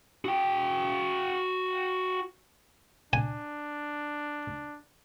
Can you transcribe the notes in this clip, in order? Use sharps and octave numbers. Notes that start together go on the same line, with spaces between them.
F#4 G5
D4 G#5